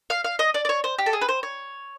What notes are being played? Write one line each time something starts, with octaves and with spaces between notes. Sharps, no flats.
F5
F5
D#5
D5
D5
C#5
C5
G4
A4
G#4
B4
C5
C#5